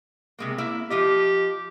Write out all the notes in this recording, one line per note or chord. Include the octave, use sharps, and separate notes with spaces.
C3 G#3 A#3
A#3 E4 E5
F3 F4 G4 D#5